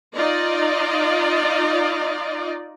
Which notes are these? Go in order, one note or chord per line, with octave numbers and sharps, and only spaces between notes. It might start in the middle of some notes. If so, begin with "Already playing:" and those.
D#4 F4 D5 D#5